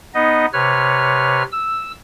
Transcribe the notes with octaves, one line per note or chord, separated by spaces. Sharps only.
B3 D#4 D#5
C3 B4 C#5 F6
E6